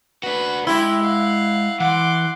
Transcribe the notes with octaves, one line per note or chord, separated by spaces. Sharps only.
D4 F#4 B4
G#3 E4 G4 C6
F5 F#5
E3 F#5 C6 D6